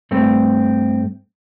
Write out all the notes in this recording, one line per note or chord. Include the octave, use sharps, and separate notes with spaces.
G2 A3 C4